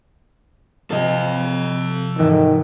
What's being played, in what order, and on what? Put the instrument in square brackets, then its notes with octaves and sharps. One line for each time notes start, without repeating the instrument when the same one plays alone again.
[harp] C3 F3 [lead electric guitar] A4 D#5
[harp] G#1 E2 E3 [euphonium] D#3